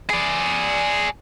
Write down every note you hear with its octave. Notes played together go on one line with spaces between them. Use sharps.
G#4 D5